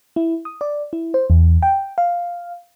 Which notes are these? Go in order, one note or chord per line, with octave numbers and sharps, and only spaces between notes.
E4
D#6
D5
E4
C5
E2
G5
F5